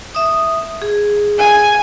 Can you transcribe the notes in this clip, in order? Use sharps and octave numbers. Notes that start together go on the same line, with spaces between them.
E5 D#6
G#4
G#5